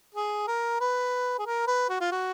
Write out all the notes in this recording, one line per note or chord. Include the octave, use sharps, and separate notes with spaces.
G#4
A#4
B4
G#4
A#4
B4
F#4
F4
F#4